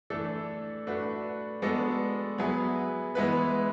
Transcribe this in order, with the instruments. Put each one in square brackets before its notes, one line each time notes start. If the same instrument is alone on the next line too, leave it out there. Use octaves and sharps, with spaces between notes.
[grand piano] E3 A3 D4 A4
A3 D4 F#4 B4
G#3 B3 D4 F#4 A4
F#3 B3 E4 G#4 B4
E3 G#3 B3 E4 B4